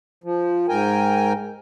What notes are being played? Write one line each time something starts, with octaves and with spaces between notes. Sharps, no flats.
F3
G#2 A#4 G5 G#5